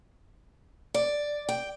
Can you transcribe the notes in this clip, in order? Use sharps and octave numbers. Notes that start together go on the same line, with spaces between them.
D5
G5